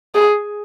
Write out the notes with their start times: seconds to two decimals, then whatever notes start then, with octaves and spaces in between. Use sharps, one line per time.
0.15 G#4